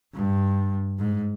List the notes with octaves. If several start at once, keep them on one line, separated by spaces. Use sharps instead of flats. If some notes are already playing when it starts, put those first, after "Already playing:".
G2
G#2